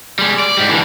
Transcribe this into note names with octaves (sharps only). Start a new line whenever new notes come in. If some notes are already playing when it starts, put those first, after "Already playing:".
G3 G#3
D5
G#2 G3
D3 E3